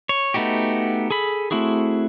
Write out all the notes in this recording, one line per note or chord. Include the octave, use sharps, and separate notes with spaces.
C#5
A3 B3 D#4 F#4 G4
G#4 A4 B5
A3 C4 E4 F#4 G#4